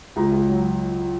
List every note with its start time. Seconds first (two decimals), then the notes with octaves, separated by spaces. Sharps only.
0.16 C#2 A#5
0.32 C#2
0.48 F#3